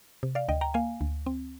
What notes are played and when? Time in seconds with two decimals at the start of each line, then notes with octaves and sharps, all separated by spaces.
0.23 C3
0.35 D5 F5
0.48 D2 D#5 G5
0.61 G5 A#5
0.74 A#3 F5 G#5
1.01 D2
1.26 C4